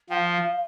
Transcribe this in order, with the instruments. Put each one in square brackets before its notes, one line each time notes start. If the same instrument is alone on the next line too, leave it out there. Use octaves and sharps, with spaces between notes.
[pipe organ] F3 [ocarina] G5
[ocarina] F5